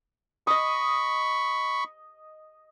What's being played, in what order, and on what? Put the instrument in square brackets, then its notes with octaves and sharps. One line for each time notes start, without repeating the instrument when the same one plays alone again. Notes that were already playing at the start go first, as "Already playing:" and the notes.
[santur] D#5 D#6 [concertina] B5 C#6